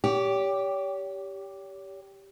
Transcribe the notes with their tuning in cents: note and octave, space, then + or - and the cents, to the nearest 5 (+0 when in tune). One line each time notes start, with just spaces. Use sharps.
G4 +0 C#5 +40